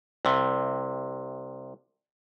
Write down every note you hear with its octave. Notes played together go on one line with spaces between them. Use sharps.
C2 C3